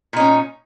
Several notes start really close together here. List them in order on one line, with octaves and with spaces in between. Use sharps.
A#2 D#4 C#4